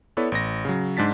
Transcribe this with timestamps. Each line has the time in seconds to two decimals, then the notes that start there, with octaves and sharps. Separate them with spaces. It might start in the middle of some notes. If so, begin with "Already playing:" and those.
0.17 B3 E4 A4 B4 C#5 D5
0.32 A1 A#6
0.65 C#3 F#3
0.97 G#2 G#3 D4 A6 B6